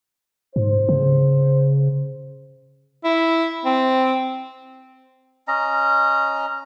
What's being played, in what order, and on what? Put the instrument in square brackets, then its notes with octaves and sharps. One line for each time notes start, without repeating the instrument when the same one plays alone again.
[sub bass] G#2 [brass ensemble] C5
[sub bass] C#3
[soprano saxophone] E4
C4
[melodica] C#4 D#5 A#5